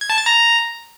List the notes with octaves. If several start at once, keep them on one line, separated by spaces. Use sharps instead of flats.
G#6
A5
A6
A#5